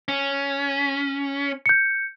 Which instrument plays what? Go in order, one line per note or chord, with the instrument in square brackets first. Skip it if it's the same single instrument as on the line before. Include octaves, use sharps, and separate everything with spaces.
[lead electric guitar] C#4
[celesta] G6 C#7